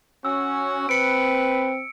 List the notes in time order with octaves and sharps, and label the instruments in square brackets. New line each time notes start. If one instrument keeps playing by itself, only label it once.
[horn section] C#4 F#4 [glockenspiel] E6
[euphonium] C4 [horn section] B4 [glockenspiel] C#7 D7